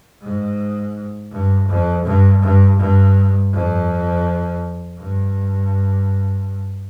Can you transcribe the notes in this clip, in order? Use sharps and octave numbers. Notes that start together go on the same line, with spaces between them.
G#2
G2
F2
G2
G2
G2
F2
G2